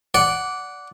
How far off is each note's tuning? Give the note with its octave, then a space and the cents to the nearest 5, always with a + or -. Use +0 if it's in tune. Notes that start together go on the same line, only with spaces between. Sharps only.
D5 -15 F#5 +0